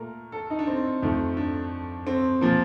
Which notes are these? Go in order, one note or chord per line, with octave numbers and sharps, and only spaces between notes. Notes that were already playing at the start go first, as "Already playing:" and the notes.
Already playing: A#2 A3 A#4
A4
D#4
D4
C4
F2 D#3 A3
D4
C4
A#2 F3 A#3